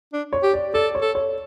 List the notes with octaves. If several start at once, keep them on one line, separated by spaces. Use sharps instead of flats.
D4
C#5
G4
D5
A4 D5
C#5
A4
C#5